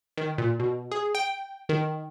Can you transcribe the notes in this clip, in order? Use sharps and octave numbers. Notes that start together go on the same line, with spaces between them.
D#3
A#2
B2
G#4
G5
D#3